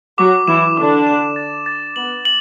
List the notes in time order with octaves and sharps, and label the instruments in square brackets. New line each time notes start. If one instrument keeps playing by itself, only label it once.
[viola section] F#3 F#4 [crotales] D6
[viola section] E3 E4 [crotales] E7
[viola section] D3 D4 [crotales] D6
[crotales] E7
A6
A6
[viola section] B3 [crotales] F#7
[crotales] F#7